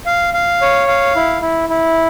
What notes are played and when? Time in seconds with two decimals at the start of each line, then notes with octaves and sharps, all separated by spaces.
0.06 F5
0.34 F5
0.62 C#5
0.88 F5
1.16 E4
1.42 E4
1.69 E4